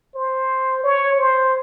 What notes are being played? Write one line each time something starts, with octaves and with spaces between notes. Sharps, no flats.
C5
C#5
C5